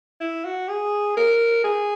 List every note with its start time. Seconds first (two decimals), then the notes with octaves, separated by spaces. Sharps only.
0.20 E4
0.45 F#4
0.69 G#4
1.17 A#4
1.64 G#4